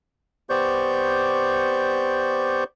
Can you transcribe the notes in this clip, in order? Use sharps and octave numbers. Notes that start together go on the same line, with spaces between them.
B3 G4 C5 D5 C#6 G6